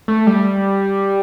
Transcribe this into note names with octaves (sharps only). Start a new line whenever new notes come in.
A3
G3